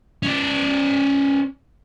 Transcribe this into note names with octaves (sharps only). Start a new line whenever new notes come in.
C#4 D5